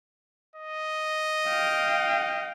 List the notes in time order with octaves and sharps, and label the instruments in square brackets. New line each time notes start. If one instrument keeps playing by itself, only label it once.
[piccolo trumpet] D#5
[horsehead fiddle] F5 G5